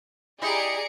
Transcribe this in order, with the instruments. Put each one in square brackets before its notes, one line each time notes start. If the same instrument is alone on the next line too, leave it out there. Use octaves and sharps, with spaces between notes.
[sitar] E4 G4 D#5 [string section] G#4 [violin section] D5 A#5 [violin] C#7 D7